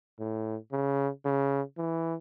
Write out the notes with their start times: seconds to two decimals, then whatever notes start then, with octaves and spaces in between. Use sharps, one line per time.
0.20 A2
0.72 C#3
1.25 C#3
1.78 E3